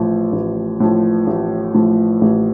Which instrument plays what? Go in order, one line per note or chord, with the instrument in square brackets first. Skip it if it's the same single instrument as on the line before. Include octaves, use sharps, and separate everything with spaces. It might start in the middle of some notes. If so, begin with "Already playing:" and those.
Already playing: [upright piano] A1 A2 F3
A1
A2 F3
A1
A2 F3
A1